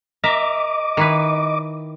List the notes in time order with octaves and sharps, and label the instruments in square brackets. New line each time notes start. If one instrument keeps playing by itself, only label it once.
[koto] A#4 E5 [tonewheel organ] D#5 D6
[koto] D#3 E4 B4